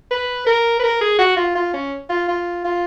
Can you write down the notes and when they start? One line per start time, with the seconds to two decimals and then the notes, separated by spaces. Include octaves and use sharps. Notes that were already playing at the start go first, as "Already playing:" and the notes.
0.11 B4
0.47 A#4
0.79 B4
0.84 A#4
1.01 G#4
1.19 F#4
1.37 F4
1.55 F4
1.74 C#4
2.10 F4
2.29 F4
2.65 F4